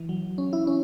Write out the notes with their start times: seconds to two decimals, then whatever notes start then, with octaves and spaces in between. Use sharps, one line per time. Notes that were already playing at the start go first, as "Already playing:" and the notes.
Already playing: E3
0.09 F#3
0.38 C#4
0.53 E4
0.67 C#4